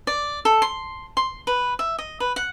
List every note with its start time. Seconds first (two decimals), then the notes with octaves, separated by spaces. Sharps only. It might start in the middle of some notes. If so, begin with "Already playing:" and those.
0.07 D5
0.45 A4
0.62 C6
1.17 C6
1.47 B4
1.79 E5
1.99 D#5
2.20 B4
2.36 F#5